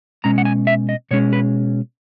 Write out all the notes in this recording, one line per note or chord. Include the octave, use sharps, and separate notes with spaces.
B2 G#3 C#4 A#5
F#5
G#5
E5
D#5
B2 G#3 C#4 C#5
B4